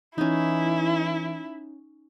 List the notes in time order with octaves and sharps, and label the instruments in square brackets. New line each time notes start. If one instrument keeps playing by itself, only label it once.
[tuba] E3 [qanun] C#4 D#4 [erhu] E4